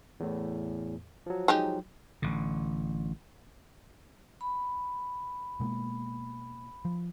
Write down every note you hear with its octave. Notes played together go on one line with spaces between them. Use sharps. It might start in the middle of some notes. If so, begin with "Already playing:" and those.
E2 A2
F3 F#3
G#3 D#4 G4
A1 D3
B5
B2 G#3 A#3
F3